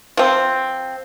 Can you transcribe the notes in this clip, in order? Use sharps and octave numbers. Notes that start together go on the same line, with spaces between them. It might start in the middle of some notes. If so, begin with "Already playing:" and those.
F3 C4